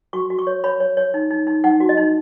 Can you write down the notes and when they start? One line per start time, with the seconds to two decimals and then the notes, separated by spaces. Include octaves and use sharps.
0.13 F#4 C#6
0.30 F#4
0.39 C#6
0.47 C#5
0.64 C#5 B5
0.80 C#5
0.97 C#5
1.14 D#4
1.31 D#4
1.47 D#4
1.64 D#4 F#5
1.80 F#4
1.89 D#5
1.97 D#4